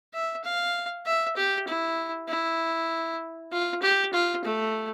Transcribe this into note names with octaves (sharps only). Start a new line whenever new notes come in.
E5
F5
E5
G4
E4
E4
F4
G4
F4
A3